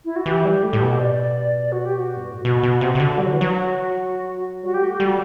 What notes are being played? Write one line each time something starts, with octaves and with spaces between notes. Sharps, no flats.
E4
F#4
E3 G4
G3
A3
A2
B2
D5
F#4
G4
F#4
G2
A2
B2 F#4
B2
C3
C3
D3
G3 F#4
F#3
E3
F#3
G3 F#4
G4
A3 F#4
G4
G3 F#4